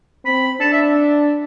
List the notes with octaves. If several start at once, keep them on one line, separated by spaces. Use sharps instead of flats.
C4 B5
D4 A5
E5